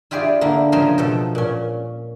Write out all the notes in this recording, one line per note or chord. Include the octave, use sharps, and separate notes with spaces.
E4 F4 G4 G#4 D5
D3 A#3 E4
C#3 F3 G#4 A#4 C5
B2 F3 A4
A#2 C#4